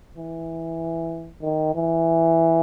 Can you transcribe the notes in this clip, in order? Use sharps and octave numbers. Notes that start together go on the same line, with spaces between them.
E3
D#3
E3